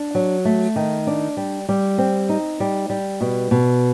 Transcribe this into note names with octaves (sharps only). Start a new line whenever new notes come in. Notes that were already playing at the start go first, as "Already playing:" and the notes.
Already playing: D4
F#3
A3
D#3
D4
G3
G3
C4
D#4
G3
G3
B2
B2